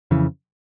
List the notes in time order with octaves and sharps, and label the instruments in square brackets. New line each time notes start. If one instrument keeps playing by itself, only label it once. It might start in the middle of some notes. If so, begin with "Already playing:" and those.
[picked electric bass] F2 C#3 E3